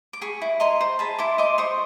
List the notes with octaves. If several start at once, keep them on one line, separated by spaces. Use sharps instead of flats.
D6
G#4 B5 C#6
E4
D#5 A#5 C6
C5
G#4 A5 B5
E4 C6 D6
D#5 C6 D6
C5 C#6 D#6